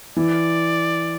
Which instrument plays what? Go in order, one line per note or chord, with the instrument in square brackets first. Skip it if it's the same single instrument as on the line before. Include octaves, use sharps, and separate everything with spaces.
[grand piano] E3 [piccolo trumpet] D5